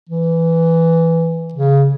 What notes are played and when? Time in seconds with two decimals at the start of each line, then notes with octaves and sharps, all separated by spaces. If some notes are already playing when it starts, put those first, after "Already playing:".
0.09 E3
1.54 C#3